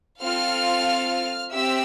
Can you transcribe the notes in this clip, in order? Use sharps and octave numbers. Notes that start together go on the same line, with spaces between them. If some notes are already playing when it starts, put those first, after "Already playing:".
C4 F4 A4 F5 F6
C4 G4 E5 E6